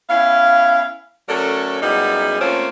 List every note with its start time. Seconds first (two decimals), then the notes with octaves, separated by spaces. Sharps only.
0.09 B3 C#4 E4 F5
1.29 F#3 A3 C#4 A4 A#4 D5
1.82 F#2 G3 B3 D#4 E4 G#4
2.41 F3 A3 A#3 C4 C#4